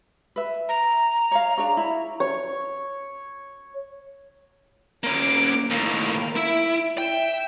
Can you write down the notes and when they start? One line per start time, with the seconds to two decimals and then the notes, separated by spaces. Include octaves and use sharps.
0.36 B4 E5
0.69 A#5
1.31 C#5 F5
1.58 D4 G#4 C#5
1.77 E4
2.20 C#5
5.03 A#3 C#4 A#4 D6
5.70 D#2 A2 A#3 F7
6.36 E4 E5 D7
6.98 E5 G5 E7